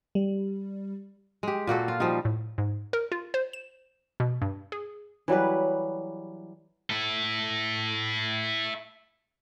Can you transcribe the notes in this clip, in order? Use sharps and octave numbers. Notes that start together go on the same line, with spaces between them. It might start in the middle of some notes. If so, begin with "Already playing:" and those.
G3
G#3 G4
A#2 A#3 F#4 A4
F4
F3 G3 D#4
A2
G#2
A#4
F4
C5
E7
B2
G2
G#4
E3 F#3 G3 B4
E4 A4